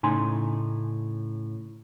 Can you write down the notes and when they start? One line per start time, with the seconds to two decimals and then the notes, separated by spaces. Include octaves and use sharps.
0.03 A2 C#3 D#4 G#5 C6